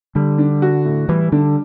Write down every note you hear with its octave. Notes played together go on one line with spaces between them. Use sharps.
D3 G3
D4
F#4
A2
E3 G3
D3 D4